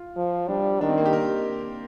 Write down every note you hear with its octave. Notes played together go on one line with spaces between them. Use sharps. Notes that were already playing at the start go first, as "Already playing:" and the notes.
Already playing: F4
F3
G3 D4
D#3 D4
C4
A#3
G4
A#4